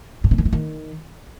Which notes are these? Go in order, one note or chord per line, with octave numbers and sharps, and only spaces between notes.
A2
C3
D#3
E3
D#3